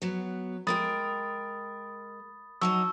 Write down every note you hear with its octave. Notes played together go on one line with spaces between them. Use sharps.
F#3 B3
G#3 A#4 G5 B5 D#6 A6
F#3 D#4 D#5 A5 C#6 E6